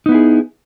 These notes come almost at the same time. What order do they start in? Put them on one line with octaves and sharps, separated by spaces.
D#4 B3 E4 G#4